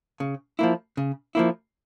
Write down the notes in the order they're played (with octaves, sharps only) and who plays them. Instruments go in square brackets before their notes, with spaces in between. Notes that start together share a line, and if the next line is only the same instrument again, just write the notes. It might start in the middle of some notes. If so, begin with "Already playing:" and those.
[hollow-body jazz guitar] C#3
F3 A#3 E4
C#3
F3 A#3 E4